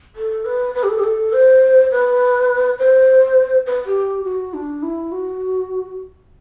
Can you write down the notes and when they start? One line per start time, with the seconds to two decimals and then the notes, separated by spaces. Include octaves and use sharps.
0.16 A4
0.45 B4
0.75 B4
0.83 G4
0.89 A4
0.99 G4
1.04 A4
1.33 C5
1.92 B4
2.79 C5
3.66 B4
3.86 G4
4.24 F#4
4.54 D4
4.83 E4
5.12 F#4